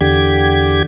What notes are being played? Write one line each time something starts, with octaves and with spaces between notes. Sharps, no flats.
E2 D3 G4 G#6